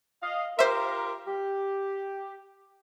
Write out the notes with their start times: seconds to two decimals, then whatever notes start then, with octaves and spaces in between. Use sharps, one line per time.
0.23 D#5 F5
0.59 F4 G4 A#4 C5 E5
1.28 G4